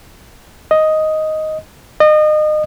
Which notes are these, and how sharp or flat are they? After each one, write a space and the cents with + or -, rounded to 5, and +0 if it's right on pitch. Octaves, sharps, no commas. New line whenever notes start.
D#5 +5
D#5 -30